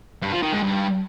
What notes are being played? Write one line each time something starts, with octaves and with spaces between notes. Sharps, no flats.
G2
F3
D#3
G#2
G2